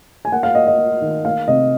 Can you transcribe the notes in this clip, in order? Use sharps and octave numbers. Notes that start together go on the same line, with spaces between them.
G#5
A#3 F#5
F5
A#3 D#5
D#5
A#3
D#3
A#3 F5
C3 D#5